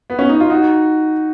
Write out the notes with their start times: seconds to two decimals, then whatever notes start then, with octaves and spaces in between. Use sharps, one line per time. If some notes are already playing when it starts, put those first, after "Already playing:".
0.10 B3
0.19 C#4
0.29 D#4
0.40 F4
0.50 D#4 F#4